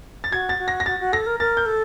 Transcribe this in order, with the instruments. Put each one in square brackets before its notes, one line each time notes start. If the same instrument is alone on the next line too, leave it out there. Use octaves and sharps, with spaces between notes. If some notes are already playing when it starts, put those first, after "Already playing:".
[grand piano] A6
[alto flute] F#4 [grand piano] G#6
[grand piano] A6
[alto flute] F#4
[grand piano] A#6
A#6
[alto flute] F#4 [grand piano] A6
[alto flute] F#4
[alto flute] A4 [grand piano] A#6
[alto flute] A#4
[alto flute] A#4 [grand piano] A6
[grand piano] G6
[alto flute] A4